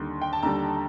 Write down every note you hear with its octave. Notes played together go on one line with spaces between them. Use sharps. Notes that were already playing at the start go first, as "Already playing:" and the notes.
Already playing: D#2 D3 G3 C6
G5
A5
D#2 D3 G3 A#5